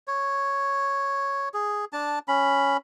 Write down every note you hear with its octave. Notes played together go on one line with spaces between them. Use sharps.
C#5
G#4
D4 A5
C#4 B5